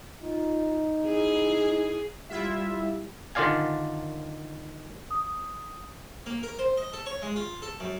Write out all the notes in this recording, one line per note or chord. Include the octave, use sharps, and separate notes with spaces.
D#4 F4
E4 G#4
G3 E4 F4 E5
D3 D#3 F4 D5 F5 G#5
D#6
A#3
A#4
C5
D#5
A4
C#5
G#3
F4
A4
F#2